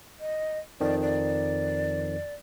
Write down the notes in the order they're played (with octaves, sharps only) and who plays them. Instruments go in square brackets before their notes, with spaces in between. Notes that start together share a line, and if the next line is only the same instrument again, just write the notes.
[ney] D#5
[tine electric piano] F2 D#3 F3 [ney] D5
[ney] D5